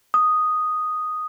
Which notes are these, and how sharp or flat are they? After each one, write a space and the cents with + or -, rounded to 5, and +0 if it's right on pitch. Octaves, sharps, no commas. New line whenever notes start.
D#6 -5